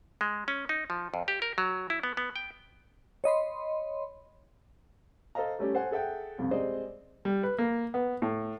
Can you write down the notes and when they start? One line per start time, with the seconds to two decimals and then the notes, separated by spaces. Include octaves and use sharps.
0.21 G#3
0.48 C#4
0.69 D#4
0.90 F3
1.14 F2
1.28 G4
1.42 A#4
1.58 F#3
1.90 E4
2.03 B3
2.17 B3
2.36 G5
3.24 C#5 D#5 B5 C6
5.35 A4 C5 D#5 F5 A#5
5.59 G3 A3 C#4 G4
5.74 A4 C5 F#5 G#5
5.91 G#4 A4 E5 F#5 G5
6.38 C2 F2 C3
6.51 G3 G#3 C4 C5 D5 D#5
7.25 G3
7.43 B4
7.58 A#3
7.94 B3
8.22 A2